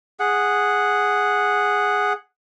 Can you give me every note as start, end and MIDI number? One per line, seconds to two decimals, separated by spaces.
0.20 2.13 68
0.20 2.13 78